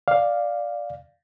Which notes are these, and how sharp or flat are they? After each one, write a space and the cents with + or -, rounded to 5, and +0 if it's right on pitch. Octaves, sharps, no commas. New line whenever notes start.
D5 +0 F5 +0